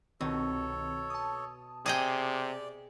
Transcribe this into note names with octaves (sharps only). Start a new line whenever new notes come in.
C2 B2 D#3 C4 A4 C#5
A5 D#6
C3 G#4 D5 D#5 G5